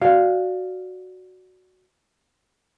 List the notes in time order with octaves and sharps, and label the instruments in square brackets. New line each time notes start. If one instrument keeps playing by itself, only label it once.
[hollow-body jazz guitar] F#4 D5 F5